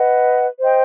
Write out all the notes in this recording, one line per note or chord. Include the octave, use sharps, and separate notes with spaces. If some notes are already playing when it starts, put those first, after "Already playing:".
Already playing: B4 D#5 F#5
C5 D#5 G5